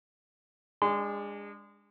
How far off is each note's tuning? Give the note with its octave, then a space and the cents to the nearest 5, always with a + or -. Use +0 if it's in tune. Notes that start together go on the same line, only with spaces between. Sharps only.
G#3 -25 D4 +0 C6 -30